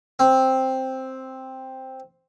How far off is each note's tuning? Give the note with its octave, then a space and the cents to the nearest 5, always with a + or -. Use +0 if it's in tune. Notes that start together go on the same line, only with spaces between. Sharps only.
C4 +5